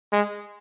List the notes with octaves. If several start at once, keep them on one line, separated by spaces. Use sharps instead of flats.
G#3